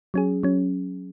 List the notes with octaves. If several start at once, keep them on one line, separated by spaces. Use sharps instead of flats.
F#3 C#4 G#4
F#3 C#4